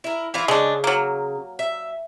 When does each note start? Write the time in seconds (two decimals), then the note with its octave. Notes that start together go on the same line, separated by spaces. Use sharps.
0.04 E4 A#4
0.34 E3 E4 F4
0.48 C#3 G#3 D4
0.84 F#3 A#3
1.59 E5